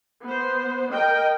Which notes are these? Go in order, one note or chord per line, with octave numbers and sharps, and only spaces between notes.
B3 C5
A#4 D#5 G5